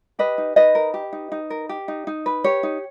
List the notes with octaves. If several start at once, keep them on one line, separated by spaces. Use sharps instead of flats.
G4 B4 D#5
D#4
D#4 B4 D#5
A#4
G4
D#4
D#4
A#4
G4
D#4
D#4
B4
G4 C#5
D#4